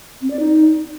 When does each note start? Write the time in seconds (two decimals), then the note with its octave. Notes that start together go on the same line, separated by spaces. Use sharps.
0.22 C4
0.30 D5
0.39 D#4